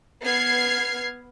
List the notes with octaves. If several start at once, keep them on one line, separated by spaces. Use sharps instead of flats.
B3 F6 G#6 C7